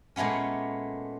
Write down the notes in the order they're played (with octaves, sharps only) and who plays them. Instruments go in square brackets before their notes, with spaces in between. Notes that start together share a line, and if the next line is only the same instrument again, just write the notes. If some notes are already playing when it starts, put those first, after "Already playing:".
[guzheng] A#2 G#3 A3 B3 C#4